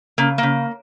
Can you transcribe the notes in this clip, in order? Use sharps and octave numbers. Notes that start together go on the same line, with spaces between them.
C#3 A#3
C#3 A#3